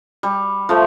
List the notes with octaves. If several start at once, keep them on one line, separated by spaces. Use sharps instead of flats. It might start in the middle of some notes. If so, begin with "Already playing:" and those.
G3
F3 A3